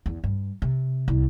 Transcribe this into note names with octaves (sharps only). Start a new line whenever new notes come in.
E2
G2
C3
C2